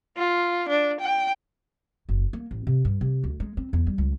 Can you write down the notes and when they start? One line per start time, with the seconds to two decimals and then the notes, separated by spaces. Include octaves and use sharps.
0.17 F4
0.69 D4
1.01 G5
2.09 F#1
2.33 A#3
2.51 A1
2.67 C3
2.85 G2
3.01 C3
3.24 D2
3.40 G#3
3.57 C4
3.73 E2
3.87 G3
3.98 C#2